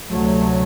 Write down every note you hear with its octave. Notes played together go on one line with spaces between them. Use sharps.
D2 C3 F#3 A3